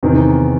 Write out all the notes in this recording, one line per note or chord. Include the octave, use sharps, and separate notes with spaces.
E2 C3 D#3